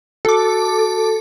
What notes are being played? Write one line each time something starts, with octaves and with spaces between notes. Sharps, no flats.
F#4 A4 A5 D6